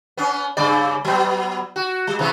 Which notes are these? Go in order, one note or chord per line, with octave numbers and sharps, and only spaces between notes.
B3 C#4
G2 C#3 D5
F#3 B3
F#4
G3
C3 E3